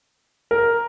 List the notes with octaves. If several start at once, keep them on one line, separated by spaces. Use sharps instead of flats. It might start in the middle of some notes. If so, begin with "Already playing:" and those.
A#4